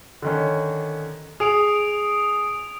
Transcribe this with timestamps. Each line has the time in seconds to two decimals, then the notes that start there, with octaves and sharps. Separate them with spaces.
0.22 D3 D#3 C#4
1.40 G#4 D#6 D7 F7